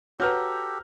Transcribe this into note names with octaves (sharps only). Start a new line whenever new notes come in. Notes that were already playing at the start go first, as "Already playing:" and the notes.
F#4 G4 A4 B4 C#5 A#5 F6 G6